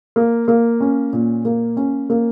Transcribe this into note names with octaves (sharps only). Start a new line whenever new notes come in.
A#3
A#3
C#4
A#2
A#3
C#4
A#3